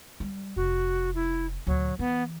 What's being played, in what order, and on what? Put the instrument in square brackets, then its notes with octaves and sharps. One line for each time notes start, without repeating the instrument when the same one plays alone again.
[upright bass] G3
[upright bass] F1 [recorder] F#4
[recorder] E4
[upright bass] D2 A#2 [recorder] F#3
[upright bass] E3 [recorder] B3